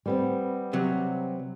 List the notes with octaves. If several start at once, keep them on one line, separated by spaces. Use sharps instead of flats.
G3 B3 C4
C3 F#3